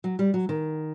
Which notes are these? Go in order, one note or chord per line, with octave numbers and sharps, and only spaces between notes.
F#3
G3
F#3
D#3